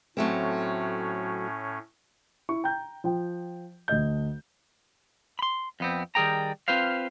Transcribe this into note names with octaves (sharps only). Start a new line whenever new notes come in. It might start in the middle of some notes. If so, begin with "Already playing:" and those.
A2 F#3 A3 C4 C#4
E4 C#6
G5 A#5 G6
F3 G5
D2 A3 D#5 G6
B5 C6
F2 B3 C4
D#3 G3 G#4 G5 A#5
C4 F4 B4 C5 F5